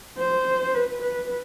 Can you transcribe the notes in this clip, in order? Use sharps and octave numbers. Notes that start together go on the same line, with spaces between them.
C5
B4
B4